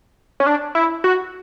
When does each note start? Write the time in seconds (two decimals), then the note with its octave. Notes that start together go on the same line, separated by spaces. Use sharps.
0.40 C#4
0.47 D4
0.75 E4
1.04 F#4